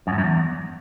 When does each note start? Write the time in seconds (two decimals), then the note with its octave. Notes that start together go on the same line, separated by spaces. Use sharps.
0.07 F#2
0.13 G2
0.18 F#2
0.24 E2